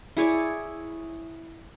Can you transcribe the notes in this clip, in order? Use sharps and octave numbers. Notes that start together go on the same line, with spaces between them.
E4 G#4 C#5 D5